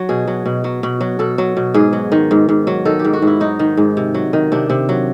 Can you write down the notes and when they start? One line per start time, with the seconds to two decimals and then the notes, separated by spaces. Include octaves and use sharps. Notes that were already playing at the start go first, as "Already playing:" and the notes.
Already playing: F#3
0.09 B2 G#4
0.27 F#3
0.46 B2
0.64 F#3
0.83 B2
1.01 F#3
1.19 B2 A4
1.38 F#3
1.57 B2
1.74 G#2 G#4
1.93 F#3
2.12 D#3
2.31 G#2
2.49 G#2
2.67 F#3
2.85 D#3 A4
2.99 G4
3.05 G#2
3.13 F#4
3.22 G#2 E4
3.40 F#3 D#4
3.59 D#3
3.77 G#2
3.97 C3
4.14 F#3
4.33 D#3
4.52 C3 D4
4.70 C3
4.89 F#3